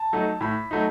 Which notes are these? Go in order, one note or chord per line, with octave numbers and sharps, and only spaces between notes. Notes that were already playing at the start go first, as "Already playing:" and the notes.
Already playing: A5
F#3 A3 D#4
A2 B5
F#3 A3 D#4